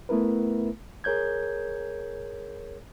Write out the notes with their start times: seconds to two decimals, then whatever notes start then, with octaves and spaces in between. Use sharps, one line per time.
0.09 A3 B3 E4 A#4 B4
1.04 G#4 A#4 C#5 G6 G#6